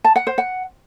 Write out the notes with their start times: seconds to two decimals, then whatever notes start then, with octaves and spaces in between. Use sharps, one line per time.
0.04 A5
0.16 F#5
0.27 C5
0.38 F#5